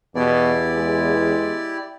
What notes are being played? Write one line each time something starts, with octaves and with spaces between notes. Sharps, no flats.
E2 B2 E4 G4 D5
G#3